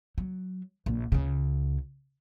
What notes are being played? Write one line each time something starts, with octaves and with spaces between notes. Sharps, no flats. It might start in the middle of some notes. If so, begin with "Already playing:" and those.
F#3
A#1
C#2 C#3